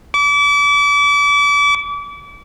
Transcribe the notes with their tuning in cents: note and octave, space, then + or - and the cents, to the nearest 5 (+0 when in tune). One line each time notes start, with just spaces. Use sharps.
D6 -35